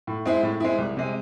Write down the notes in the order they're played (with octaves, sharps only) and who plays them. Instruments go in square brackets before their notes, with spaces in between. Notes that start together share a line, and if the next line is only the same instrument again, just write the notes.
[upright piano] A2
G#3 C4 E4
A2
G#3 C4 E4
C2
C3 G#3